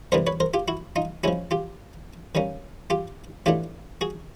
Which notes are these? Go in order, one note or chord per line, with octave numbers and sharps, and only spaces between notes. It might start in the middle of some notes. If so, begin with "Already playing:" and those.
C3 E3 G3 B3 D4 A#4 C5
B4 C#5
A#4 C5
F4 G4
E4 F#4
D#4 F4
F3 G#3 C#4 E4 F#4
F4 G4
D#3 G3 A#3 C#4
F4 G4
A2 E3 A3 D4 F4 G4
F#4 G#4